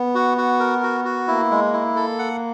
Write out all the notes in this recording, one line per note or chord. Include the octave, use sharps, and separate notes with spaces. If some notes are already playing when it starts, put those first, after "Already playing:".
Already playing: B3
F#4
F#4
A#4
F#4
F#4
A#3 E4
G#3
E4
A4
F#5